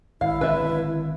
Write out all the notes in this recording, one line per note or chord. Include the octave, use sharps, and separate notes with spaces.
G#1 E4 F5
G#1 D3 C4 B4 E5